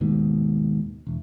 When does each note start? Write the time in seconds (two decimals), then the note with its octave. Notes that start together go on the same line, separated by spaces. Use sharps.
0.01 D#2 G#2 B2
1.07 E1